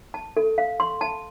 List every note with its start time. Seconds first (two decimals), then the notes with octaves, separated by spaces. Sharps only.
0.14 A5
0.37 A4
0.58 F5
0.80 C6
1.01 A5